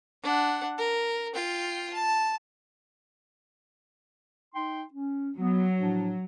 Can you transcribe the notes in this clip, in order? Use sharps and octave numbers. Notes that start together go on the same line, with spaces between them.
D4 F#5
A#4
F4 G5
A5
D#4 G5 C6
C#4
F#3 B3
A2 F3 D4